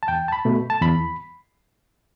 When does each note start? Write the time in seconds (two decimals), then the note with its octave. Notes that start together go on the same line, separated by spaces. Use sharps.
0.03 A5
0.08 E2 G5
0.28 A5
0.32 B5
0.45 B2 A3
0.70 A5
0.82 E2 B5